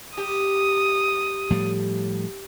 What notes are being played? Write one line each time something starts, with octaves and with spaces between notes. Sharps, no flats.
G4 D#6
A2 F3 G3